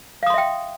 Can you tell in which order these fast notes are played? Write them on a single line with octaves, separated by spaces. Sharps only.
F5 D#6 C6 E5 G5